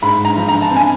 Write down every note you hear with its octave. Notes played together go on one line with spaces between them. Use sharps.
G#2 B5
A#5
F3
A#5
A5
C4
G#5